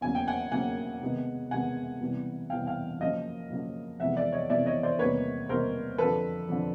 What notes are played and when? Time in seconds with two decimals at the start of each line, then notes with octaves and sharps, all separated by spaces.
0.01 E2 C#3 F#3 A#3 G#5
0.15 G5
0.27 F#5 G#5
0.51 E2 C#3 F#3 A#3 F#5 G#5
1.01 C3 D#3 G#3 B3
1.51 C3 D#3 G#3 B3 F#5 G#5
2.00 C3 E3 G3 B3
2.50 C3 E3 G3 B3 F5 G5
2.67 F5 G5
3.00 F#2 C#3 F3 A#3 D#5 F5
3.50 F#2 C#3 F3 A#3
4.00 F2 C3 E3 G#3 B3 E5 F#5
4.16 D5 E5
4.32 C#5 D#5
4.49 F2 C3 E3 G#3 B3 D5 E5
4.66 C#5 D#5
4.83 C5 D5
4.99 E2 C3 D#3 G3 A#3 B4 C#5
5.49 E2 C3 D#3 G3 A#3 A#4 C5
5.98 F2 D3 F3 A4 B4
6.49 F2 D3 F3